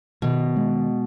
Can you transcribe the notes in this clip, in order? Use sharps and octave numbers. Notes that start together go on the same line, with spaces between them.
B2 D#3
G#3